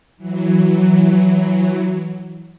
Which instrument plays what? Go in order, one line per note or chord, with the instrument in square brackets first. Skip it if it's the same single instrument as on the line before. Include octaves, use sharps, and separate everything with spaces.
[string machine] E3 F#3